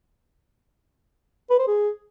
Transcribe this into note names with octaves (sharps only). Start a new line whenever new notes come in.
B4
C5
G#4